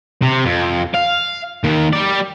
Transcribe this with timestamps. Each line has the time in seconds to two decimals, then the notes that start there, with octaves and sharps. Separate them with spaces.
0.22 C3
0.45 F2
0.94 F5
1.64 D#3 A#3
1.93 G3 D5